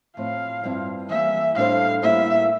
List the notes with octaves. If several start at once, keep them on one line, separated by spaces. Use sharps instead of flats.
A2 F3 C4 F5
G2 F3 C4 E4
E3 G3 A#3 E5
A2 G3 D4 A4 C5 F5
A2 G3 A#3 E4 E5